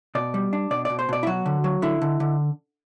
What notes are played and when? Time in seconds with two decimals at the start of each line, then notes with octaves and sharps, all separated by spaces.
0.15 B2 D5
0.34 G3
0.53 D4
0.71 B2 D5
0.85 B2 D5
0.99 C5
1.09 B2 D5
1.23 E4
1.27 F#3 F#4
1.46 D3
1.64 F#3
1.82 D3 E4
2.02 D3
2.20 D3